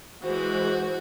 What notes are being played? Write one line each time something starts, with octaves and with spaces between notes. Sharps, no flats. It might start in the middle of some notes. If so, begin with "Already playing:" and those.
E3 G#3 F#4 C5